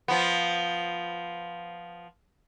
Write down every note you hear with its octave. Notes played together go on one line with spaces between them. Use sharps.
F3 B3